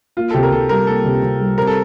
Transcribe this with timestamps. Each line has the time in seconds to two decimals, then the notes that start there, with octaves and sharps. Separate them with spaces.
0.17 A#3 F4
0.30 A4
0.34 C3 G4
0.43 A#4
0.52 C3 A4
0.69 G3 A#4
0.87 A#3 A4
1.05 C3
1.22 C3
1.40 G3
1.58 C4 A#4
1.67 A4